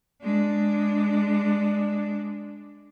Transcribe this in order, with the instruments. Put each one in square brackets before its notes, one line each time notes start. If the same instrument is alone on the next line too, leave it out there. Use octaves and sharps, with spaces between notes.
[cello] G#3 D4